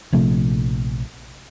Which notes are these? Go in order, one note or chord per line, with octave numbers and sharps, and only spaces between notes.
A#1 C3 F3 A3